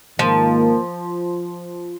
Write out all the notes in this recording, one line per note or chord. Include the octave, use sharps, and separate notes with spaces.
G#2 D#3 F3 A#3